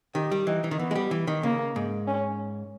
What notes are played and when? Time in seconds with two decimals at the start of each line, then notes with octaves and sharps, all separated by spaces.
0.15 D#3 G4
0.31 G3
0.47 E3 D#4
0.64 E3
0.71 D#3
0.79 E3 B3
0.91 G#3
0.95 G3
1.11 E3
1.27 D#3
1.43 C#3 A#3
1.76 G#2
2.07 C#4